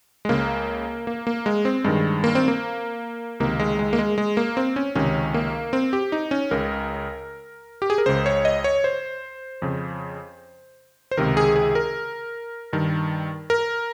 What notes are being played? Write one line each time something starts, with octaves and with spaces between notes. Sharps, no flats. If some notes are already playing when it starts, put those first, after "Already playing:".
G#3
C#2 C#3 A#3
A#3
A#3
G#3
C4
G2 D#3 G#3
A#3
C4
A#3
C#2 C3 D#3 A#3
G#3
G#3
A#3
G#3
G#3
A#3
C4
C#4
C#2 C3 D#3 C#4
A#3
C4
G4
D#4
C#4
C#2 C#3 A#4
G4
G#4
A#4
C#2 C#3 C5
C#5
D#5
C#5
C5
F2 C#3
C5
C#2 C3 D#3 A#4
G#4
G#4
A#4
G2 D#3
A#4